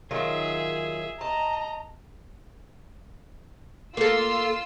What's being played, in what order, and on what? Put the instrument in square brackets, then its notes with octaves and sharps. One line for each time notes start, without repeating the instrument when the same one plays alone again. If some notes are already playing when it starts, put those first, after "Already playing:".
[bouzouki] D#3 F#3 F4 [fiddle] G#4 E5
[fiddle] D#5 [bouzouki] A5 [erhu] A#5
[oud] A#3 A4 [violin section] F4 C6 E6